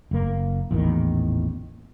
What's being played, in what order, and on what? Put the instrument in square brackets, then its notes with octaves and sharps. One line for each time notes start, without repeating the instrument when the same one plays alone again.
[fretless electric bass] F#1 A#3
A1 E2 A#2 D#3